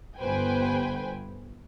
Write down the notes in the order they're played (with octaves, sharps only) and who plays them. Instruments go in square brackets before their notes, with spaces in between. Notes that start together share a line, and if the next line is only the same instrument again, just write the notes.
[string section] G1 B4 C5 G5 G#5